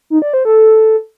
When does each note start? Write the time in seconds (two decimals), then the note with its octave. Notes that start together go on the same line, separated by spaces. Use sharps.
0.10 D#4
0.22 D5
0.33 C5
0.45 A4